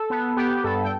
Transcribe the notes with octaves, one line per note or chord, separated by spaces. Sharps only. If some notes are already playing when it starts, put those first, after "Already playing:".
Already playing: A4
B3
B3 G4
G2 A4
G5